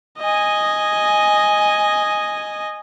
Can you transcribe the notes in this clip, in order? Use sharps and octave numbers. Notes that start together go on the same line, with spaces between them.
D#5 G#5